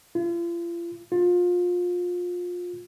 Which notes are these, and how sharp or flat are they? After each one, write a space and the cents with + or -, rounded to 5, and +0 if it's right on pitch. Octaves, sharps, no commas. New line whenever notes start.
F4 -40
F4 +25